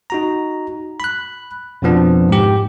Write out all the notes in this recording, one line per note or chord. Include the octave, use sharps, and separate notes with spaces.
D#4 F#4 A#5
B5 F#6
F2 B2 F3 B3 D4
G#2 G4